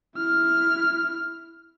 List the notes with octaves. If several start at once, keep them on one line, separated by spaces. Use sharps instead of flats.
E4 F6